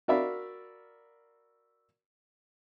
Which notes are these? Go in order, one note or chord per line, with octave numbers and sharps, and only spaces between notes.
F#4 A#4 D5 E5 F5 B5